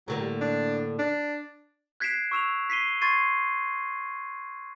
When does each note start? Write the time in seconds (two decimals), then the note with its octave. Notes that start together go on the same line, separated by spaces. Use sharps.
0.08 A2 D3 F#3 A#3
0.20 G3
0.41 D4
0.99 D4
2.00 F#6 G#6 B6 C7 D7 E7
2.31 C#6 E6 E7 F7
2.70 B6 C7 D#7 G7
3.01 C6 C#6 G#6 A6 C7 D#7